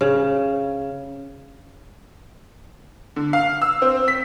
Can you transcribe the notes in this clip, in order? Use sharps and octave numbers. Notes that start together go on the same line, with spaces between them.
C#3
D3
F5
E6
C4
B6